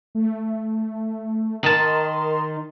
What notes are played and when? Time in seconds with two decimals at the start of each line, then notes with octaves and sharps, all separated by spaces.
0.15 A3
1.64 D#3 A#4 D#5 A5 C6